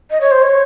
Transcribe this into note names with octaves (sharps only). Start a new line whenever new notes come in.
D#5
C#5
C5
C#5